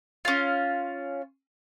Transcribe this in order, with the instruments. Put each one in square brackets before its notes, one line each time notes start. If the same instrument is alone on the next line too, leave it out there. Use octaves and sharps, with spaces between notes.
[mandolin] C#4 F4